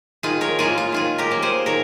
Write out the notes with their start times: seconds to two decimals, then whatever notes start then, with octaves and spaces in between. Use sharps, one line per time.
0.23 D#3 F4 G#4
0.41 A#4 C#5
0.59 A#3 C#4 F4 G#4
0.78 F4
0.92 D#3 F4 G#4
1.18 G4 A#4
1.31 A#3 C#4
1.42 G#4 C5
1.66 D#3 A#4 C#5